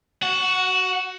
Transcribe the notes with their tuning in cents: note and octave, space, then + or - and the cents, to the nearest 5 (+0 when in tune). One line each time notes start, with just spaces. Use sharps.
F#4 +15 F#5 -15